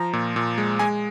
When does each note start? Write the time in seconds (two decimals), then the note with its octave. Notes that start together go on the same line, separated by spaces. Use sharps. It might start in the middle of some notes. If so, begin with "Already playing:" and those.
Already playing: F3 A#5
0.13 A#2
0.36 A#2
0.58 G#3
0.79 G#3 G#5